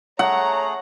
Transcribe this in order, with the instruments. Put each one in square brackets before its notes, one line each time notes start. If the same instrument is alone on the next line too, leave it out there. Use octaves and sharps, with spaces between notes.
[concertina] A3 G#4 [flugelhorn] C#5 [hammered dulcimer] F#5 [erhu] A#5